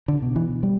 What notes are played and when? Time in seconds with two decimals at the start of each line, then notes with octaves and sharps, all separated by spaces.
0.08 D3
0.22 B2
0.36 E3
0.63 G3